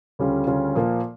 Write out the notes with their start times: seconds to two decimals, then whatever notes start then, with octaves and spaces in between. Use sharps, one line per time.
0.19 D2 C#3 G3 C#4 F4
0.47 D2 C#3 G3 C#4 F4
0.75 A#2 F3 A#3